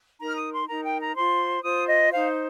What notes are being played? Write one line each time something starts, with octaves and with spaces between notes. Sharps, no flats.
D#4 A#4 A#5
F6
D#6
C6
D#4 A#4 A#5
G5
A#5
F4 C5 C6
F4 C5 D#6
D#5
D#4 C5 F5